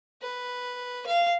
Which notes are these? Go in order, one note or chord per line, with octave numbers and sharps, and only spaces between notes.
B4
F5